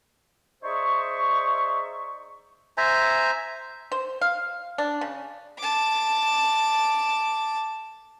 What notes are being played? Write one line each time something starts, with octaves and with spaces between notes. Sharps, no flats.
D#4 G#4 C5 D5 E5 C#6
C5 E5 G#5 A#5
C5
F5
D4
C#3
A5 D6